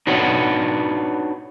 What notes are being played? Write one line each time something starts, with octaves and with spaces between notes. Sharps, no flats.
D4 D#4 F#4 B4 C#5